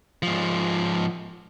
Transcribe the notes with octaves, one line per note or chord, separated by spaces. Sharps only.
G#2 F3